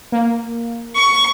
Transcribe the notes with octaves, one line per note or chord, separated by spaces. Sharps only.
A#3
C#6